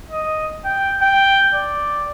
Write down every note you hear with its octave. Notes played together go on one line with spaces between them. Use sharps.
D#5
G5
G5
D5